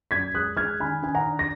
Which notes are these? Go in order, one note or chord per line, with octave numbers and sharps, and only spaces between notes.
F#2 G#6 B6
G#3 D#6 F#6
G#3 F6 G#6
D#3 G#5 B5
D#3 G#5
F#5 A#5
D4
A#6